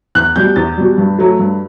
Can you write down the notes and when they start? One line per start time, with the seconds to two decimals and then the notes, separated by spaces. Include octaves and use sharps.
0.15 E2 F#6
0.36 B2 G3 G6
0.56 E2 A6
0.78 B2 G3
0.98 G2
1.19 F#3 A3
1.39 G2